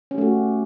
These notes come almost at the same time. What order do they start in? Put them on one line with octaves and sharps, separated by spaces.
C#4 G4 A3 F#4